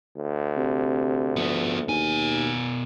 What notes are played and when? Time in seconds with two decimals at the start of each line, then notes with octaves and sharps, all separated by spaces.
0.17 D2
0.57 C3
1.36 F3 B3
1.88 D#2 B2 G#5